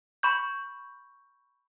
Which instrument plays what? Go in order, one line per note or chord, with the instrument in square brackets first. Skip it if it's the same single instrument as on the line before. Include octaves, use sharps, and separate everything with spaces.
[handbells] B5 C#6 G6